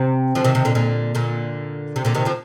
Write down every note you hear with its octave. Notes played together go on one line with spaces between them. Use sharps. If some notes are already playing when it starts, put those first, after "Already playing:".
Already playing: C3
D3 F3
C3 D#3
C3 D#3
A#2 D3
A#2 D3
A#2 D3
C3
A#2 D3
C3 D#3
D3 F3